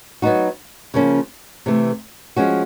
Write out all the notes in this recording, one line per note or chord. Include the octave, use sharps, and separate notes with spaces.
F#3 B3 D#4 F#4
C#3 F3 A#3 C#4
C3 E3 A3
F3 G#3 C#4 F#4